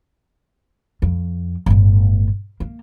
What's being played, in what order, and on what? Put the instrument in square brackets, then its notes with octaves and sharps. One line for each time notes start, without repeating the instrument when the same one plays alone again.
[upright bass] F2
G1 A2
A#3